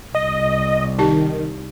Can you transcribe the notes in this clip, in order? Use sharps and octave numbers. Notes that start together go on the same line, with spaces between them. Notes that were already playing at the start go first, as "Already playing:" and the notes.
C2 D#5
D#3 D#4 G4 A5